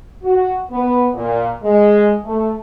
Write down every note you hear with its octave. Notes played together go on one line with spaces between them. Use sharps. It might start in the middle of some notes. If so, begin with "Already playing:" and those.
F#4
B3
A#2
G#3
A3